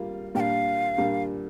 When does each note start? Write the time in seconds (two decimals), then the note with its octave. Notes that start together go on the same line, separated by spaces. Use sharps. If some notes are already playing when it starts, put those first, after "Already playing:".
Already playing: G3 A#3 F4 F5
0.35 A#2 G3 A#3 D4 A#4 G5
0.40 F5
0.98 A#2 G3 A#3 D4 A#4